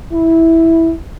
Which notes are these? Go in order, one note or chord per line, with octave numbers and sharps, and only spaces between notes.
E4